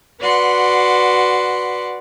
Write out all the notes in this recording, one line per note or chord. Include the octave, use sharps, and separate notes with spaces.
F#4 B4 D5 F#5 C6